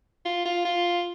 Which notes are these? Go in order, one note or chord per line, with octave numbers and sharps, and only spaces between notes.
F4
F4
F4